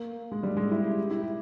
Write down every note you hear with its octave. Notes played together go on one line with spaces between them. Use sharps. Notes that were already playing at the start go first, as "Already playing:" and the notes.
Already playing: A#3
G#3
G3
G#3
E4
G4
G4
E4
G4